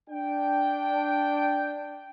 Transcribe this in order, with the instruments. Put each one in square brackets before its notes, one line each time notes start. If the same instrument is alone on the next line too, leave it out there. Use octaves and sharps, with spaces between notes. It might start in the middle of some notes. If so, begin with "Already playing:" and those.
[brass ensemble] D4 G5